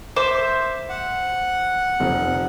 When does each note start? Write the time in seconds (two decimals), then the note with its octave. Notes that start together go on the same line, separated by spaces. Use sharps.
0.16 C5 E5 D6
0.89 F#5
2.00 F1 F2